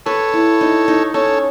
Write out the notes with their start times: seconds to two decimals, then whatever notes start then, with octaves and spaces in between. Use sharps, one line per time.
0.06 A4 B4 C#5
0.33 E4
0.61 D#4
0.88 D#4
1.14 C#4 A4 C#5